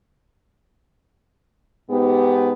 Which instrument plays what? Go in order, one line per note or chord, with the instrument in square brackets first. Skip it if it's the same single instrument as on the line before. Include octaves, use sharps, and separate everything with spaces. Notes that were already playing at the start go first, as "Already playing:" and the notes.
[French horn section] G#2 B3 G4